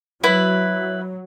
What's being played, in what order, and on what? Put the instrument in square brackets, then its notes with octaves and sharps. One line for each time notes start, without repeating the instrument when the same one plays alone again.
[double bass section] F#3 [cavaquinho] E4 B4